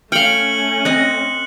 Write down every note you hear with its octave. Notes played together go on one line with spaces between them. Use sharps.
A3 C#4 F5 G5 F6 C#7 F#7
C4 D#5 F#6